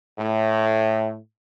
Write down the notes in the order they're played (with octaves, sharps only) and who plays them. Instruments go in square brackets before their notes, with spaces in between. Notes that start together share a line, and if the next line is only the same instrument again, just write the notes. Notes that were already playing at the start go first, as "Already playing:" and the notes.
[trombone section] A2